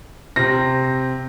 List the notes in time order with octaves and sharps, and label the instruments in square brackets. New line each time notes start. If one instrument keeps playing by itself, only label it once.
[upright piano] C3 C4 A#6